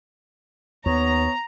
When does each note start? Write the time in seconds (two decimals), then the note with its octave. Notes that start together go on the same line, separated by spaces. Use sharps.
0.86 D#2 B3 C#5 A#5